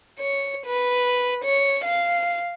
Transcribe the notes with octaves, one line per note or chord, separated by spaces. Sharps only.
C#5
B4
C#5
F5